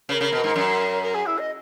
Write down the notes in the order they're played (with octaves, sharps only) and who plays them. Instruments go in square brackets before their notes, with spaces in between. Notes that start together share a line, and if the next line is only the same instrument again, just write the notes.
[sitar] C#3 [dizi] B4
[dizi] A#4
[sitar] C#3
B2
G#2
F#2
[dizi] A#4
G#4
E4
D#5